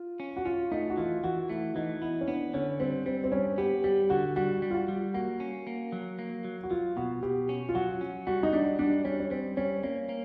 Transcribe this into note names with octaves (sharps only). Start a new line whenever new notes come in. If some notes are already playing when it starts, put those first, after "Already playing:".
Already playing: F4
C#4
F#4
C#4 F4
A3 D#4
F#4
E3 F4
E3 F#4
A3 E4
E3 D#4
B3 E4
C#4
B3 D4
D3 C#4
G3 C4
G3 C4
C4
G2 C#4
B3 G4
G3 G4
D3 F#4
G3 F#4
G3
F4
F#4
G3
A#3 F#4
C#4
A#3
F#3
A#3
F#3
F#4
F#3 F4
B2 F#4
B2 G4
C#4
F4
F#3 F#4
C#4
G3 F#4
D#4
G3 D4
G3 D4
G3 C#4
C#4
G3 C4
G3 C#4
A#3 C#4
A#3